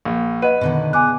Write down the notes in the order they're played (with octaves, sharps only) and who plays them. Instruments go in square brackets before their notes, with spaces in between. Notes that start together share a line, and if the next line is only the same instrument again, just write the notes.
[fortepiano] A#1
[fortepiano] B4 [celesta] D#5 F#5 D#7
[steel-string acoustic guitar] B2 D3 D#3
[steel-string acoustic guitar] G#4 [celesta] G#5 D6 F#6